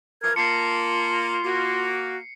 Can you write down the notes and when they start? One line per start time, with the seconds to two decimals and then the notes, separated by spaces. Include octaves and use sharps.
0.23 E3 F3 A#4 G#6
0.36 A#3 F4 A5 C7 C#7
1.44 A#3 F#4